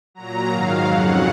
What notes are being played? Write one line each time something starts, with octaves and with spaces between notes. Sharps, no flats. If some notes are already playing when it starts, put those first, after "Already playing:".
A#2 F#3 A#5
G#2 D#3 F#3 F5
F2 C#3 F#3 F#5